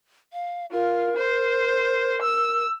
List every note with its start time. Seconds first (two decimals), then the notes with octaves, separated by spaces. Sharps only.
0.33 F5
0.72 F4 A#4
1.16 C5
2.22 E6